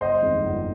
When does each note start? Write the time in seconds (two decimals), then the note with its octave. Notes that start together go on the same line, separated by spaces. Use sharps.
0.01 G1 C5 D#5
0.21 F2 D#3 G#3 C4
0.42 G1